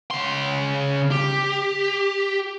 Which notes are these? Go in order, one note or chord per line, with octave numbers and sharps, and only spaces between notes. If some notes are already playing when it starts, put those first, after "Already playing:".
C#3 C6
G4